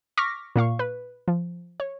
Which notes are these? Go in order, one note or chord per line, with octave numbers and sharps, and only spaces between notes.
C#6 D6 F6 A#6 B6
A#2 A#3 F5 C#6
B4
F3
C#5